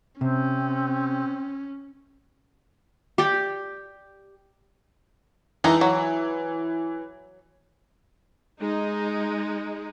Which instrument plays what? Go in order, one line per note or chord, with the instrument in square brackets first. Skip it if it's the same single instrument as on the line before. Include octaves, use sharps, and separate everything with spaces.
[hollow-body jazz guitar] C3 [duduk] C4 [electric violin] C#4
[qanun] G4 D5 G5
[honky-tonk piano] E3 [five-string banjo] G#3 D#4 A4
[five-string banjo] F#3
[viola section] G#3 D#4